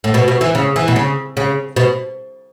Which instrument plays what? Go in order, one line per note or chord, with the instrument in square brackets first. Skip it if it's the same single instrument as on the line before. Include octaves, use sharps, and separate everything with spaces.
[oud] A2
B2
B2
E3
C#3
E3
B2
C#3
C#3
B2